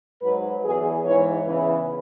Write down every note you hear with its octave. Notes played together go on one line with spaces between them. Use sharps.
G#2 F#3 B4
E2 E3 G#4
G#2 E3 C#5
E2 C#3 E3 B4